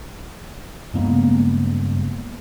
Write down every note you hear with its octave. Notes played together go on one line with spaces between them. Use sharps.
G2 C#3 G#3 A#3 B3